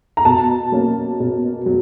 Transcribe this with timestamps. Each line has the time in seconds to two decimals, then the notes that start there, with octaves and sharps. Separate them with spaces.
0.17 A#5
0.25 B2 A5
0.72 F#3 A#3 C#4
1.20 B2
1.66 F#3